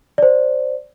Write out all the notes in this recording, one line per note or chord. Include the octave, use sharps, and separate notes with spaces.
C5 D5